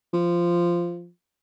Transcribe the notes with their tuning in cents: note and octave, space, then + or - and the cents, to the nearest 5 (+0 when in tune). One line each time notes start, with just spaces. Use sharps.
F3 -10